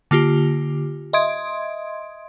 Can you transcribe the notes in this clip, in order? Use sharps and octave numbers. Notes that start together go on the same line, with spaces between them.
D3 A#3 F4 G4
D#5 E5 C6 D#6 G#6 D7